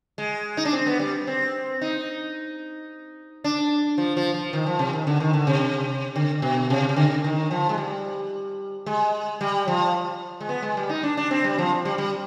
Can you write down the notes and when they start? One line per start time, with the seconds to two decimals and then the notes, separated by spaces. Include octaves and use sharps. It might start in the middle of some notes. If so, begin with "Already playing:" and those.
0.18 G#3
0.57 D#4
0.65 D4
0.73 C4
0.86 B3
0.99 G3
1.27 C4
1.81 D#4
3.44 D4
3.98 F3
4.17 F3
4.34 F3
4.53 D#3
4.66 F3
4.79 C3
4.93 D#3
5.07 D3
5.20 D#3
5.33 D3
5.47 C3
6.16 D3
6.42 B2
6.70 C3
6.89 C3
6.96 D3
7.24 D#3
7.51 F3
7.69 G#3
7.78 G3
8.86 G#3
9.41 G3
9.68 F3
10.41 G#3
10.49 B3
10.62 G#3
10.77 G3
10.89 D#4
11.03 D4
11.17 D4
11.31 C4
11.44 G3
11.58 F3
11.85 G3
11.98 G3